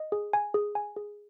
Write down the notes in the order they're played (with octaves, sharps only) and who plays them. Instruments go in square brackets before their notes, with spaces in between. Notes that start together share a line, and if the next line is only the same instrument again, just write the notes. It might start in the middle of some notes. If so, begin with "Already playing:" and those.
Already playing: [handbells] D#5
G#4
G#5
G#4
G#5
G#4